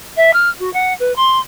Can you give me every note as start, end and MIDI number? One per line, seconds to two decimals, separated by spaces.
0.16 0.33 76
0.33 0.49 89
0.59 0.71 66
0.73 0.93 78
0.99 1.14 71
1.16 1.38 84